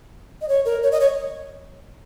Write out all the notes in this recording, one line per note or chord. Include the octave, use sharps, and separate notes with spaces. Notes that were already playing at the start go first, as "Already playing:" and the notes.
D#5
C#5
A#4
C#5
D#5
C#5